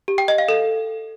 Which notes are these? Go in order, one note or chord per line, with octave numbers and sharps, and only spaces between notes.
G4
G5
D#5
F5
A4